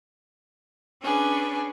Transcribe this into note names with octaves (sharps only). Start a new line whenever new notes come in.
C#4 D4 G#4 B4